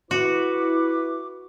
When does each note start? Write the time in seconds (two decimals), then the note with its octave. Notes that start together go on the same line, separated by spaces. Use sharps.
0.11 E4 F#4 B4 D6